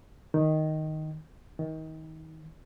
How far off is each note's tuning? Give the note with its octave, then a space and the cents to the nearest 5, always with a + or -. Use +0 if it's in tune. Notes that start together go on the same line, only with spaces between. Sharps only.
D#3 +0
D#3 +30